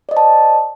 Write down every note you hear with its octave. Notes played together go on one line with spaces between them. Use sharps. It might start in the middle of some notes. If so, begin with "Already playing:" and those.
C5 D5 D#5 A5